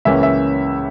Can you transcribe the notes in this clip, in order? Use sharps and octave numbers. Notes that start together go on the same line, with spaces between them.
C#2 C#3 E3 A#3 C#4 E5
E5